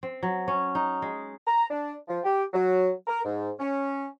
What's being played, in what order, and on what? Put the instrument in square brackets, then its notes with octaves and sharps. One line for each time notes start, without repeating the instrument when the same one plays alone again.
[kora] C4
F#3
C#4
D#4
G#3
[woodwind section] A#5
D4
F3
G4
F#3
A#4
G#2
C#4